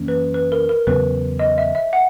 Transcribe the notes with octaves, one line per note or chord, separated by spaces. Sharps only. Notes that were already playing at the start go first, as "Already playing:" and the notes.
Already playing: F#2 E3 A#3 C#4
B4
B4
A#4
A#4
E2 C#3 F#3 B3 B4
D#5
E5
E5
F#5